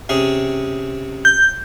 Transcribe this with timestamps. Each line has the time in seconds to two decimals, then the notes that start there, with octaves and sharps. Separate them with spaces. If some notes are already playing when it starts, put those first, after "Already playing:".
0.09 C3 C#4 G#4
1.25 G6